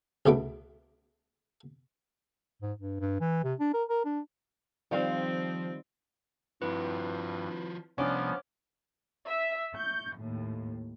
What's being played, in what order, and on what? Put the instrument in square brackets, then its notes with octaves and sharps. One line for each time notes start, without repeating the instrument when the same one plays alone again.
[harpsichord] C#2 B2 A3 B4 D6
[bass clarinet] G#2
G2
G2
E3
C3
D4
A#4
A#4
D4
[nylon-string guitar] D#3 G3 F5 [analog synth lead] F3 [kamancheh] C4
[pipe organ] G2 [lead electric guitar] F3 F#4 [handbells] C4 E4 B4
[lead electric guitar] C2 [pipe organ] F3 B3 [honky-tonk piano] C#4 D4 [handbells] C#5 D6 F6
[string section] E5
C#6 G6
D#2 A2